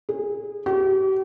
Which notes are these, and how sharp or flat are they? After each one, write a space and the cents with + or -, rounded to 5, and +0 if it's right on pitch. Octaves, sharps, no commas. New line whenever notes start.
G#4 -25
G4 -40